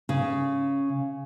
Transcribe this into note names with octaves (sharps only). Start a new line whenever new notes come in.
C#3